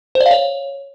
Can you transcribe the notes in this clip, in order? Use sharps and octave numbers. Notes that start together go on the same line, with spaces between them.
C5
D5
F5
C#5